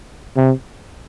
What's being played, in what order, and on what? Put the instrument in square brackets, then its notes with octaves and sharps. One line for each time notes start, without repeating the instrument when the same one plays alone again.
[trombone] C3